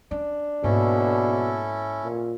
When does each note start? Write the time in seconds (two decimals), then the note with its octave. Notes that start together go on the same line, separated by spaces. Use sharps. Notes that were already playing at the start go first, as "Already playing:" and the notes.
0.11 C#4 D4
0.64 G#2 B2 A#3 C#4 E4 A4
2.04 A#2